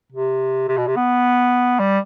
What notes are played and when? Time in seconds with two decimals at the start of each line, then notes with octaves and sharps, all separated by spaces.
0.12 C3
0.68 C3
0.78 B2
0.87 C3
0.96 B3
1.80 G3